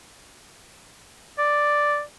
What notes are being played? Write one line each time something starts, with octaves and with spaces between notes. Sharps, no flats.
D5